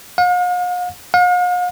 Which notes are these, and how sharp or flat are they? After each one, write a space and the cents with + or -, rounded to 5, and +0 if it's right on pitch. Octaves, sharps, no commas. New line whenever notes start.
F5 +45
F5 +45